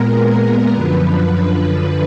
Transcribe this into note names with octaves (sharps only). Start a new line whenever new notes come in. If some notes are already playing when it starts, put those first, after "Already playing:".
Already playing: A#2 G#3 B3 A#4
F#2 D3 F3 B4